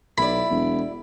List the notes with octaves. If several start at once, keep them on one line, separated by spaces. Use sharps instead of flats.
B1 E4 D5 B5
E1